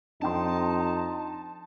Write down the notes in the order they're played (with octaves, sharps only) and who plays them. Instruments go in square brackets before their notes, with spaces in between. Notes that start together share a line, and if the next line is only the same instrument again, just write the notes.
[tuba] F2 [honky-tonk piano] D4 G5 C6 [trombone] D#4 [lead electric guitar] A5